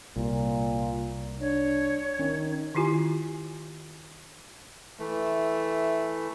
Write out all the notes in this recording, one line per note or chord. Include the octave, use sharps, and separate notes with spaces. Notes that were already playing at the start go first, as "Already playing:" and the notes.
C2 A#2
D4 C#5
D#3 C#4
D#3 E4 F4 G4 G#5
E3 A3